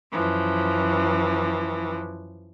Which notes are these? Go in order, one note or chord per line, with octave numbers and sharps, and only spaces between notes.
F#2 E3 F3